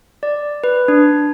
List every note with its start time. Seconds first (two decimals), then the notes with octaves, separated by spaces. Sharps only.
0.23 D5
0.64 B4
0.88 D4